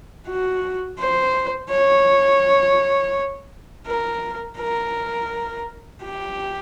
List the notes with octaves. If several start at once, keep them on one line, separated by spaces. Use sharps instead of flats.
F#4
C5
C#5
A#4
A#4
G4